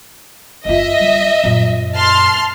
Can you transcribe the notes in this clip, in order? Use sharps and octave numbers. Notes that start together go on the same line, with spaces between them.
F#1 F4 D#5 E5
G3
F#2 A#2
A5 C6 F6